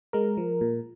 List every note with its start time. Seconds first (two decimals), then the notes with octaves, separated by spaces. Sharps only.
0.13 G#3 A#4
0.37 F3
0.61 A#2